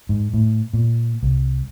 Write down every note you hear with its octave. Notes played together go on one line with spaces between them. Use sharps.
G#2
A2
A#2
C2